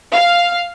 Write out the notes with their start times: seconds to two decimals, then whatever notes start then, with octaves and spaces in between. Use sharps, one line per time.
0.14 F5